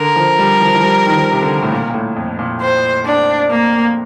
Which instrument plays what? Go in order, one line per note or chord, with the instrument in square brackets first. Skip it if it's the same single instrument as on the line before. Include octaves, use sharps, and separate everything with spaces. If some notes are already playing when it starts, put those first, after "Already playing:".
Already playing: [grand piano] D3 [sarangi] A#4
[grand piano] F3
G3
F3
F3
G3
D#3
F3
C3
D3
A2
A#2
A#2
A2
F2
A#2
[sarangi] C5
D4
A#3